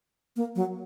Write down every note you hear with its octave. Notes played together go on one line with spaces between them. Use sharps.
A#3
F#3